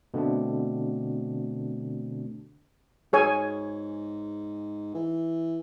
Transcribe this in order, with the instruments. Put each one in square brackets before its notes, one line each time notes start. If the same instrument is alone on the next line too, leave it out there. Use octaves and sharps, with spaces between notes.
[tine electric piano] B2 D3 A3 C4 D4
[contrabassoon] G#2 [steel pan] G#4 C#5 G#5
[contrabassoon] E3